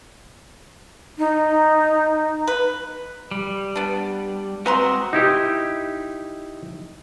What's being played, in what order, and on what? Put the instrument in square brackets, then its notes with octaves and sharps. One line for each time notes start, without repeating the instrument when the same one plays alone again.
[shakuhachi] D#4
[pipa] B4
[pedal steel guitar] G3
[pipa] B3 D4
[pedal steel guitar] G#3 C4 F#4 [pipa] B4 A#5 C6
[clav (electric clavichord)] D#4 E4 G4